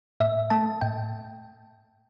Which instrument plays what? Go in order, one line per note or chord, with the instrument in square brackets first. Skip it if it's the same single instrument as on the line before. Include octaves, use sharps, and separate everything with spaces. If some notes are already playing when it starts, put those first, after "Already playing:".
[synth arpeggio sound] A2 E5
A3 A5
A2 G5